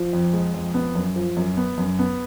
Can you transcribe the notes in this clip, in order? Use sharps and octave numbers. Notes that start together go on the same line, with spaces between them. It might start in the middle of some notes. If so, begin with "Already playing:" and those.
Already playing: F3
F2
G#3
F2
B3
F#2
F3
F#2
B3
F#2
B3